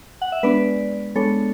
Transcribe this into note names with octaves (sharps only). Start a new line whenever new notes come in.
F#5
E5
G#3 B3 D4 B4 D5
G#3 B3 D4 A4 C#5